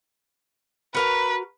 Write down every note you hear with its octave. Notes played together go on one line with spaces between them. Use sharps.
F#4 A#4 B4 A#5